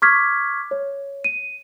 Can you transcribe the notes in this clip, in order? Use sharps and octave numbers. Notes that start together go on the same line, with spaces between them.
C#6 D6 F6 G#6 B6
C#5
D#7